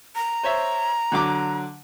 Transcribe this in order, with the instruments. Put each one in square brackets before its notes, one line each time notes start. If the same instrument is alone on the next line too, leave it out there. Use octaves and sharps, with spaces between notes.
[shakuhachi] A#5
[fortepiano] C5 C#5 E5
D3 F#3 D6